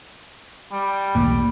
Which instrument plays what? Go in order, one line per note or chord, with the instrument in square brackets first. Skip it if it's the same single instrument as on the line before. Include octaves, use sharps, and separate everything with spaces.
[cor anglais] G3
[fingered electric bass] B1 E2 A2 [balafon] A#3